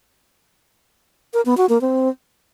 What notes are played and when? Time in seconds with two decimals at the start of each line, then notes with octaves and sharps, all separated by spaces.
1.34 A#4
1.45 B3
1.57 F#4
1.69 A#3
1.81 C4